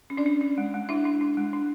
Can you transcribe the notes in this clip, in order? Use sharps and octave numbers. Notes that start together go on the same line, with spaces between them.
C#4
D4 D5
C#4
C#4
G#3
G#3
D4 E4 E5
D4
D4
G#3
D4